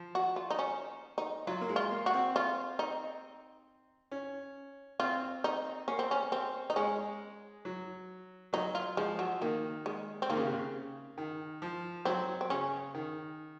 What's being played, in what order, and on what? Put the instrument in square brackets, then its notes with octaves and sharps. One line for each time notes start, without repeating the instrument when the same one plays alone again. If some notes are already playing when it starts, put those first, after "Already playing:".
Already playing: [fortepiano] F3
[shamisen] F#4
F4
D#4
C#4
D#4
[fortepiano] F#3 [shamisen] F4
[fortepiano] A#3
G#3
[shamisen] F4
[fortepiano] A#3
[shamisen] F#4
[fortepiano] C4
[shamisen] F4
D#4
[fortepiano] C#4
[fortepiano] C4 [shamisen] F4
[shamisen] D#4
[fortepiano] A#3 [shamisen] C#4
[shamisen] C4
C#4
C4
D#4
[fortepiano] G#3 [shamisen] C#4
[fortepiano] F#3
[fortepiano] F#3 [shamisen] D#4
[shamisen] F4
[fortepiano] F3 [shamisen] G#3
[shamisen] F#3
[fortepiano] D#3 [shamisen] A#3
[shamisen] G#3
C4
[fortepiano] D#3 [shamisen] A#3
[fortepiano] C#3
C3
C#3
D#3
F3
[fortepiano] F#3 [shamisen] C4
[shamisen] C4
[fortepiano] C#3 [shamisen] C#4
[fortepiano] D#3